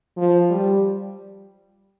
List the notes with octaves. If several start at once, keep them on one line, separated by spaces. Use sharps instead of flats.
F3
G3